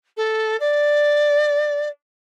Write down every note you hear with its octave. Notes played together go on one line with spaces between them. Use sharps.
A4
D5